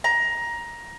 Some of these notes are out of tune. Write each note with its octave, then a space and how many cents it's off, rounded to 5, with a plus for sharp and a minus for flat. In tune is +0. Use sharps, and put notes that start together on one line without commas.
A#5 +15